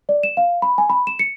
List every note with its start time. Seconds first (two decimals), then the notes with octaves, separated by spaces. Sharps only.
0.09 D5
0.23 E7
0.37 F5
0.62 B5
0.78 G#5
0.90 B5
1.07 E7
1.19 C#7